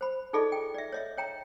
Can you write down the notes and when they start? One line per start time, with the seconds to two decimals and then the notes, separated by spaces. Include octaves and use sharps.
0.01 C5 B5
0.33 D#4 F4 G#4 A4 D5 D#5
0.52 G5
0.74 D5 E5
0.92 C#5 D#5 E5
1.17 C#5 G5 A#5